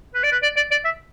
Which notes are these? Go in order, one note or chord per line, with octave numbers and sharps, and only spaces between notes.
B4
D5
B4
D5
D5
D5
E5